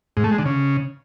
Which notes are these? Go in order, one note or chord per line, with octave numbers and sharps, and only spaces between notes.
G#2
A3
G#3
D3
C#3